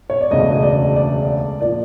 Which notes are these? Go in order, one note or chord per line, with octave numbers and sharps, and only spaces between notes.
C#5
D5
E1 D2 C#3 D#5
D#5
D5
D5
A#2 F3 D5